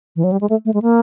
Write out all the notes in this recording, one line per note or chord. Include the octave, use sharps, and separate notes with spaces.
E3
F#3
G3
G#3
A3
A3
G#3
A#3